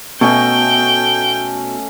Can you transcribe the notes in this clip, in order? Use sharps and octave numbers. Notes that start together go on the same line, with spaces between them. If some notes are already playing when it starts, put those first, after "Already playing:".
B2 A3 C#4 D#5 G5